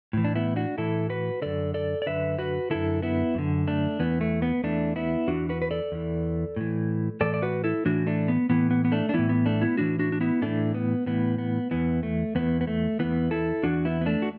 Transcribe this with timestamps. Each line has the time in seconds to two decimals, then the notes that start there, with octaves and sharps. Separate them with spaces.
0.13 A2 E3
0.24 D4
0.36 B3 E4
0.56 D4 F#4
0.78 A2 E3 E4 A4
1.10 F#4 B4
1.42 F#2 D3 A4 D5
1.74 A4 D5
2.02 D5
2.06 F#2 D3 B4 E5
2.38 F#4 B4
2.70 F#2 D3 E4 A4
3.02 B3 E4
3.35 F#2 D3
3.67 A3 D4
3.99 E2 E3 B3
4.21 A3
4.42 B3
4.64 E2 E3 A3 D4
4.96 B3 E4
5.28 E2 E3 D4 F#4
5.49 F#4 B4
5.62 B4
5.71 A4 D5
5.92 E2 E3
6.56 A2 E3
7.21 A2 E3 A4 D5
7.34 D5
7.42 F#4 B4
7.64 E4 A4
7.85 A2 E3 D4 F#4
8.07 A3 D4
8.28 B3
8.49 A2 E3 B3
8.71 B3
8.85 B3
8.92 A3 D4
9.09 D4
9.14 A2 E3 B3 E4
9.29 B3
9.46 A3 D4
9.61 B3 E4
9.77 A2 E3 D4 F#4
9.99 D4 F#4
10.12 D4
10.21 B3 E4
10.42 A2 E3 A3 D4
10.74 B3
11.06 A2 E3 B3
11.38 B3
11.71 E2 E3 B3
12.03 A3
12.35 E2 E3 B3
12.61 B3
12.67 A3
12.99 E2 E3 B3
13.31 E4 A4
13.64 E2 E3 D4 F#4
13.85 B3 E4
14.01 B3
14.06 A3 D4
14.22 F#4